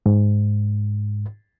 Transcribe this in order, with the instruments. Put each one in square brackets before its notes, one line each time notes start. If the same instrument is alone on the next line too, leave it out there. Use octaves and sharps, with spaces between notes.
[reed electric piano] G#2